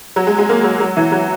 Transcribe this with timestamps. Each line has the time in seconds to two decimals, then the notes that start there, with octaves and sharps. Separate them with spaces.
0.16 F#3
0.27 G#3
0.38 G#3
0.49 A#3
0.64 F#3
0.80 F#3
0.97 E3
1.12 F#3